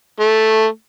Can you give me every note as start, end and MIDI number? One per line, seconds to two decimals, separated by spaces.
0.20 0.66 57